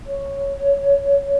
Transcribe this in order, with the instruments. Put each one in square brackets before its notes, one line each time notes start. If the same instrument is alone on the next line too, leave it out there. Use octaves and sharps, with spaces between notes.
[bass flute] C#5